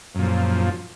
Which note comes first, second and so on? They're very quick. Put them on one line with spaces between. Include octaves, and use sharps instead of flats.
F#2 A#2 F3